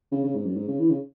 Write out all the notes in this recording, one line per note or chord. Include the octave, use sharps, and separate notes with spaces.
C#3
C#3
G#2
F#2
G#2
C#3
E3
C#3